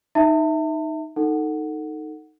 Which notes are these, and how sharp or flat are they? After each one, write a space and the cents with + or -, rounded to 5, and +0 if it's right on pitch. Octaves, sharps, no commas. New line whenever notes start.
D#4 +0 E5 -10 A5 +40
D#4 +0 A4 +20 F#5 +0